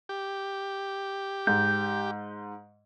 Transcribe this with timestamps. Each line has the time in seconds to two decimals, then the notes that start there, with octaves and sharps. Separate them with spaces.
0.09 G4
1.47 G#2 G6